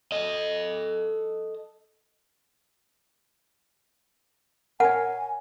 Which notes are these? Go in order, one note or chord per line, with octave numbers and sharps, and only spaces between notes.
A4 D#5
A#4 C#5 F#5 G#5